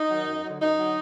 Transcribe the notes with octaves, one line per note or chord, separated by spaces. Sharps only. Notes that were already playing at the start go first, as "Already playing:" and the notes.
Already playing: D#4
D#3 F#3
F#2
F#3
D3
F#2 D#4
D3 F#3